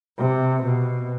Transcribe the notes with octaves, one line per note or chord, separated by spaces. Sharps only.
C3
B2